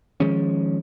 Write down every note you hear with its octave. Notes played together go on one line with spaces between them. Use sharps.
D#3 F3 G#3 C#4